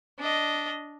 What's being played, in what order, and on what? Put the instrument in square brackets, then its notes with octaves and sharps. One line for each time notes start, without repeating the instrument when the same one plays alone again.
[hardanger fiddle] D4 D#5